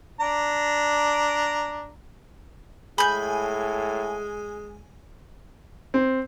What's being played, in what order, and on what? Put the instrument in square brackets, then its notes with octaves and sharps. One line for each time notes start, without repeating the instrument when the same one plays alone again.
[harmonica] D4 A#5
[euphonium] A2 [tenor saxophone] G#3 [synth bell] G#5 [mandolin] B5 G6
[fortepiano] C4